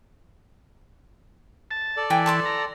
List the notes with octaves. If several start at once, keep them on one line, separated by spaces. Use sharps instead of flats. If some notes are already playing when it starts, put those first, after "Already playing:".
A5
A4 D5
E3 G5 G#5
A5 C6 D6
A#5